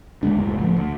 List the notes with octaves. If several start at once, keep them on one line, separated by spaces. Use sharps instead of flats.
D#2 D3 G#3 D4
F#1 C#2 A2
A2 E3 F3
D2